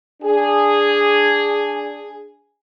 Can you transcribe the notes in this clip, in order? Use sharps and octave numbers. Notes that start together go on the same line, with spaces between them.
D4 G#4